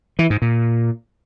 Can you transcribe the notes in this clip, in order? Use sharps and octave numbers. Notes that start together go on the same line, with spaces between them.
E3
G#2
A#2